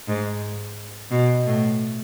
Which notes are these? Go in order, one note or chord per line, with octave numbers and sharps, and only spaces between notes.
G#2
B2
A2